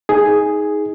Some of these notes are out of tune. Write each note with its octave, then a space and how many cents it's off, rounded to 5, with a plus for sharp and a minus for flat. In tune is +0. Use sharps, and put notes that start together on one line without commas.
D#4 +20 G#4 +0